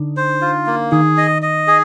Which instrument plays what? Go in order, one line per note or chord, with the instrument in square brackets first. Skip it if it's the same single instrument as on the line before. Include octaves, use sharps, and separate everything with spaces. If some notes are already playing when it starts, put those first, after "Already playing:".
Already playing: [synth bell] D3 D4 D#4
[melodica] C5
F4
A#3
[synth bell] D#3 D#4 [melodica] G#4
[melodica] D#5
D#5
G#4